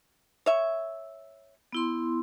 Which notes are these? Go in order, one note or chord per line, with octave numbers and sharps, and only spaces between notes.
C#5 E5
B3 E4 C6